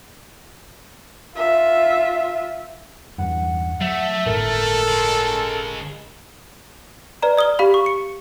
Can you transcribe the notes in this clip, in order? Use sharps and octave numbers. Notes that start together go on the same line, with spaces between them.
F4 E5
E2 G2 F#5
F#3 A3 E5
G1 A2 A4 A#4
C#3 G#3
B4 D5 A#5
D5 D#6 F6 G7
G4 F5 B5
C#6
C#7